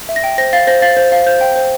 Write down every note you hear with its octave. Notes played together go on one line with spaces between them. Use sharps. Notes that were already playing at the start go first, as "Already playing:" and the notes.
E5
A#6
G5
C5 A#6
F5 A6
C5 A#6
F5 A6
C5
F5
C5 G6
G5
C5